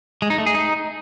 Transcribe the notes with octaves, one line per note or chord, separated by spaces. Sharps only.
G#3
D#4
A3
G#4
D#4